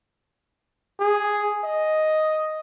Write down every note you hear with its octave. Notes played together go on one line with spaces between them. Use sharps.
G#4
D#5